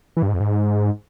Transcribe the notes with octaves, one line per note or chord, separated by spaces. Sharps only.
E3
G2
G#2
F2
G#2